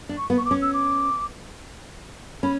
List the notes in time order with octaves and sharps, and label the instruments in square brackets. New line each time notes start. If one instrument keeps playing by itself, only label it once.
[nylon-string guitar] D4
[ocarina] C#6
[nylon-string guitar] B3
[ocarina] C#6
D6
[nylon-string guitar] C#4
[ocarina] E6
D6
[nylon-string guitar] C#4 [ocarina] B5